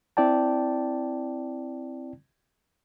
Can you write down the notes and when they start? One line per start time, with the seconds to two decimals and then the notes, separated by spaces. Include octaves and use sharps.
0.17 C4 E4 D5 G5 A5